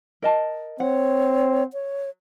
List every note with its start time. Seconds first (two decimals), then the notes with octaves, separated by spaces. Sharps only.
0.22 A#4 D#5 A5
0.80 C4 C#5 F#5
1.73 C#5